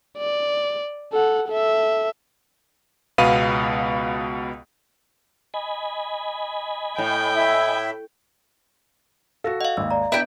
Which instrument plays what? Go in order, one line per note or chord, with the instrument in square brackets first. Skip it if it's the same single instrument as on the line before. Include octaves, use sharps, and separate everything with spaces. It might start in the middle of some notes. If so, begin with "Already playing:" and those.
[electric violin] D5
A4 F#5
A4 E5
[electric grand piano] C#2 B2 B3 F5 B5 D#7
[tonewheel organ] D#5 G#5 B5
[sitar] A2 [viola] G5
[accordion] E4 E5
[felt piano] F#4 A4 [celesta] F5 A#6
[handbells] D#5 F5 [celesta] F#5
[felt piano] G#1 D#2 [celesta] E6
[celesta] D5 A#5
[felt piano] B3 D4 [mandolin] E4 G5